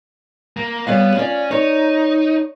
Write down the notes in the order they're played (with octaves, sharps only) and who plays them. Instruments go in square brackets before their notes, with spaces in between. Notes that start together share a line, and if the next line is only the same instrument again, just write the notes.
[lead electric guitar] A#3
[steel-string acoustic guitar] G3 C#5 F5 [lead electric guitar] B3
[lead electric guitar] C#4 [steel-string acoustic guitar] F4 D5
[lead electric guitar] D#4 [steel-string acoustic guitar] C#5